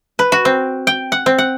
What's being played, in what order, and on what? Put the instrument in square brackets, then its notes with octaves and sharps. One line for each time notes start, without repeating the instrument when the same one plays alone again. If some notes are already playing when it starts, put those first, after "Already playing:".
[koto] B4
F#4
C4
G5
F#5
C4
F#5